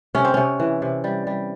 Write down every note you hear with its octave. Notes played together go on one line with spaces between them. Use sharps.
C3 C#4
C4
C3 C#4
E3
C3
G3
G3